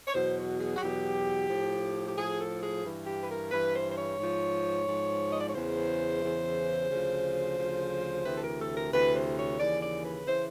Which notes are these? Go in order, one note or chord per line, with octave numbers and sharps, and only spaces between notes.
C#5
E2 B2 F#3 C5
F#4
G#4
F#4
E2 B2 F#3 G4
A2 F3
G4
A2 F3 G#4
A4
G#4
G2 E3
G4
B4
A#4
G2 E3 B4
C5
C5
C#5
G#2 F3
G#2 F3
D#5
D5
C#5
E2 C#3 E3 C5
E2 C#3 E3
D2 C#3 F3
D2 C#3 F3
D2 C3 E3 B4
A4
A#4
A4
A#4
D2 C3 E3 B4
C5
C#5
D#2 C#3 E3 D5
D5
B4
C#3 E3 C5